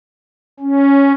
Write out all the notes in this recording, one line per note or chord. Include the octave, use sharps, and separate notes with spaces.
C#4